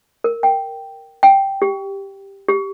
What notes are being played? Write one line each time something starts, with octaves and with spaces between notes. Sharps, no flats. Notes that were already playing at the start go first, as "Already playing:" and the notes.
A#4
G5
G5
G4
G4